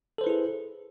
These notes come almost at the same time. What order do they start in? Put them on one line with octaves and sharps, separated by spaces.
A4 C5 B4 E4 G#4